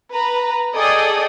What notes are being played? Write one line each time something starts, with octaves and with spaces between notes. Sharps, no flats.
B4 A#5
G#4 A4 D5 D#5 G5 D#6